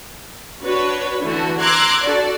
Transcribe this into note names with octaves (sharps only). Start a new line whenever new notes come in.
D4 F#4 B4 C#5
D3 E3 A3 F#4
A#5 C6 D6 E6 F#6 G#6
D4 F#4 A4 D5